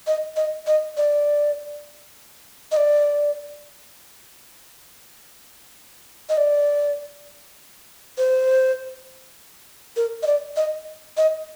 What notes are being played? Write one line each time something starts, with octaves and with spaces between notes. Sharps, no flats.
D#5
D#5
D#5
D5
D#5
D5
D#5
D5
C5
A#4
D#5
D5
D#5
D#5